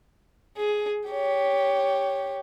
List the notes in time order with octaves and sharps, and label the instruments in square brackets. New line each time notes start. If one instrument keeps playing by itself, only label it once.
[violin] G#4
G4 C#5